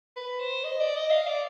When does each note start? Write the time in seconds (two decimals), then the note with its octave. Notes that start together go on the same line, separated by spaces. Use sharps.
0.16 B4
0.40 C5
0.64 D#5
0.79 D5
0.95 D#5
1.10 F5
1.27 D5